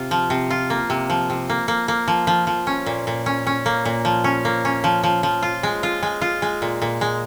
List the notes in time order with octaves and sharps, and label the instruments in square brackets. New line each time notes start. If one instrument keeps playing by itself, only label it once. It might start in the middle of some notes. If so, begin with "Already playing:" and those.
Already playing: [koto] C3 F4
F3
C3
F4
A#3
C3
F3
C3
A#3
A#3
A#3
F3
F3
F3
C#4
A#2
A#2
C#4
C#4
A#3
A#2
F3
C#4
A#3
C#4
F3
F3
F3
F4
G#3
F4
G#3
F4
G#3
A#2
A#2
G#3